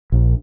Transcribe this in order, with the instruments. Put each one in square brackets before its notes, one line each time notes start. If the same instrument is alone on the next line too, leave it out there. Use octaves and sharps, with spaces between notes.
[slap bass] A#1